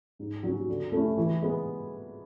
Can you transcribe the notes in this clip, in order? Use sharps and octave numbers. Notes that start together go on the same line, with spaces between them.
G#2
F#3 C#4 F#4
D3
A3 C#4 E4
E3
G#3 B3